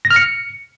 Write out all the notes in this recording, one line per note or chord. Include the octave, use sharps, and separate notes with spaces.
A#6
F6
C#7